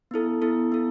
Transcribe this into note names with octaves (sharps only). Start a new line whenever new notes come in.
B3 E4 A4
B3 E4 A4
B3 E4 A4